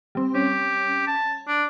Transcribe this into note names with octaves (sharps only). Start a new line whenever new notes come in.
G3 C4
C#4 G4
A5
D4